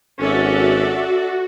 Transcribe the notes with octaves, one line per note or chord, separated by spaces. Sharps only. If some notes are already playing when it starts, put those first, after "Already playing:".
G#1 C#4 F#4 A4 D5 E5